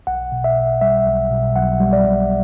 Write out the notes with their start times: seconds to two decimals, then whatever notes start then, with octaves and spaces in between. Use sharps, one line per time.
0.07 B1 F#5
0.32 B2
0.44 E5
0.56 B1
0.81 G3 E5
1.06 B1
1.31 B2
1.56 B1 F#5
1.80 G3
1.93 D5
2.05 B1